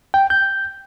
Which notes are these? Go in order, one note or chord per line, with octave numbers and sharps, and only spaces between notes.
G5
G6